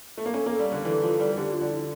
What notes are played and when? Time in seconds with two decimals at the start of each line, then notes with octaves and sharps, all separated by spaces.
0.18 A3
0.26 A#3
0.33 C#4 A4
0.46 A#3 A4
0.59 G3
0.72 D3
0.85 E3 A4
1.02 F3
1.20 G3
1.37 D3 G4
1.54 F4
1.61 D3
1.71 E4